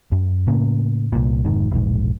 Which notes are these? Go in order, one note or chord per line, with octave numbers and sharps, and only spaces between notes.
F#2
A2 C#3 A#3
C2 A#2
F1 G#2 D#3
E1 A#1 G#2